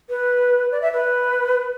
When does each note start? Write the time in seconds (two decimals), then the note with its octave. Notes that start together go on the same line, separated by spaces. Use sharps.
0.10 B4
0.72 D5
0.82 E5
0.93 B4